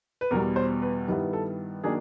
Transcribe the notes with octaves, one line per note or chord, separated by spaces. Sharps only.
B4
E2 B2 G3 A#4
C5
B4
G2 D#3 G3 B3 E4 B4
A4
D#3 F#3 A#3 D4 G#4